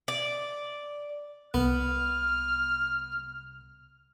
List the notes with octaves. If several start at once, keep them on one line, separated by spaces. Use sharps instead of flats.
D5
C2 B3 F6